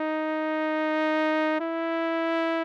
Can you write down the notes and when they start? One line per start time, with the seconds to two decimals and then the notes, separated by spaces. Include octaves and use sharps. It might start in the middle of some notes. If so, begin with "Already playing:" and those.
Already playing: D#4
1.60 E4